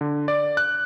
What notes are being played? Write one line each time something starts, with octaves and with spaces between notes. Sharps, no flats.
D3
D5
F#6